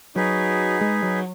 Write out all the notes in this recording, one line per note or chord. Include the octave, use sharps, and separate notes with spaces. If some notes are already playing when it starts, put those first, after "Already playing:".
F#3 D#4 G#4 B4
G#3
F#3